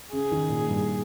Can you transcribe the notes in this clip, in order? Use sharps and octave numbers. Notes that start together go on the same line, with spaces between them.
C#3 G#4
D#3
A#2
G2